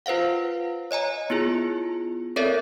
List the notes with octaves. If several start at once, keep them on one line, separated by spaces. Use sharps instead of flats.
F4 B4 C5 F5 F#5
C#5 D#5 G#5 A#5
B3 E4 F4 G#4
C4 A4 A#4 C#5 D5 E5